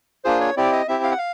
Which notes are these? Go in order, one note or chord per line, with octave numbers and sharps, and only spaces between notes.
A#3 D4 F4 G#4 C5
C#5
C4 E4 G4 D5
D#5
C4 E4 G4 E5
F5
F#5
F5